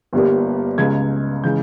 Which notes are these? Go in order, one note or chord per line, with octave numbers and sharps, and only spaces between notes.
G1 G2 G3 A#3
C#2 C#3 G#3 G#6
C#3 E3 G#3 G6